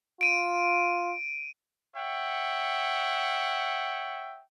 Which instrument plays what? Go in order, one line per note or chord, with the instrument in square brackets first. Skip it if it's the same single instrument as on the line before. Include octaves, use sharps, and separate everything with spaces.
[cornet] F4 [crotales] D7 D#7
[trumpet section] C#5 E5 F#5 G5